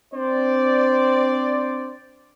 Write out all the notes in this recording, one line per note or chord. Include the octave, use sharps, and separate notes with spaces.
C4 D4 C5 D5